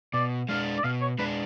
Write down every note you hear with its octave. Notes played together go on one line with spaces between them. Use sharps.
B2 D5
G#3 D4 F5
D5
B2 F5
C#5
G#3 D4 B4